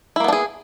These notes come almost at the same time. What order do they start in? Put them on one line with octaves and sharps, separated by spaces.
E4 A#3 B3 D4 G#4